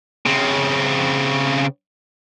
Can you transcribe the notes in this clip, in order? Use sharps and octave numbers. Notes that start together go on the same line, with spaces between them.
C#3 C4